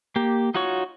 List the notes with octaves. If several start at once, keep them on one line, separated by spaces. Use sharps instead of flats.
A#3 G4
D#4 F4 F#4 C#5 C#6